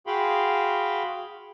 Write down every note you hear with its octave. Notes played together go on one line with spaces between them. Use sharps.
F#4 G#4 F5 G5 B5 C6